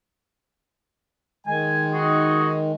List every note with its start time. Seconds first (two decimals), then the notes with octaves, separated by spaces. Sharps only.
1.47 D#3 G#3 G#5
1.92 D#4 F#4 G#4